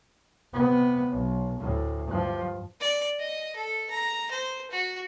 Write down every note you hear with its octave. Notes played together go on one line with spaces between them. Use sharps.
C3 B3
B1
D2 A2
G2 F3
D5
D#5
A4
A#5
C5
F#4